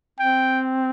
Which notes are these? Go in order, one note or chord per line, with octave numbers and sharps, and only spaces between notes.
C4 G5